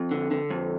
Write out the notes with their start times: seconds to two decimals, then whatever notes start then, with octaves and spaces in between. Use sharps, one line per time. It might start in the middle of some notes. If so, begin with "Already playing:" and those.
Already playing: F2
0.11 D3
0.31 D3
0.50 F2